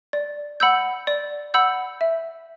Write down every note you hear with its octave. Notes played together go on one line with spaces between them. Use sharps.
D5
F#5 B5 E6 G6
D5
F#5 B5 E6 G6
E5